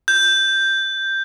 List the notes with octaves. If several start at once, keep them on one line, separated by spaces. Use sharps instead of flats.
G6